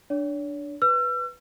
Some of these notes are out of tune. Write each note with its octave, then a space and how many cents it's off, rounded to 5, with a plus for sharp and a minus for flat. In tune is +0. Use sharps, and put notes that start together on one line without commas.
D4 +0 C#5 +40
B4 +0 E6 +45